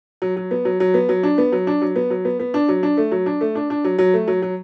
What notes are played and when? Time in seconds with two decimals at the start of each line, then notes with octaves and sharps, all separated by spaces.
0.22 F#3
0.36 F#3
0.51 B3
0.65 F#3
0.80 F#3
0.94 B3
1.09 F#3
1.23 D4
1.38 B3
1.52 F#3
1.67 D4
1.82 F#3
1.96 B3
2.10 F#3
2.25 B3
2.40 B3
2.54 D4
2.69 F#3
2.83 D4
2.97 A3
3.12 F#3
3.26 D4
3.41 A3
3.55 D4
3.70 D4
3.85 F#3
3.99 F#3
4.14 A3
4.28 F#3
4.42 F#3